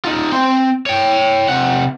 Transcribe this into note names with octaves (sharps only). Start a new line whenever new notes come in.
D#4 F4
C4 C6
C#5 G5
C3 F#5